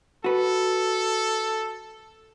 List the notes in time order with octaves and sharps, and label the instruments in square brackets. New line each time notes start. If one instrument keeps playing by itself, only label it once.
[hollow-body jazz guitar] F#4 B4 [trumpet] A4